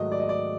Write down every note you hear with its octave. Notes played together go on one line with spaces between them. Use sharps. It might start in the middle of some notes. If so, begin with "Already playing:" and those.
Already playing: G#2 D#3 F#3 A3 D#5
D5
D#5
D5